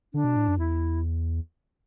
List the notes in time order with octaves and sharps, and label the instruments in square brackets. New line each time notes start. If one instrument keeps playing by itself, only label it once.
[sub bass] D3 [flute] D4
[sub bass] B2
A2
F#2
[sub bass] E2 [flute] E4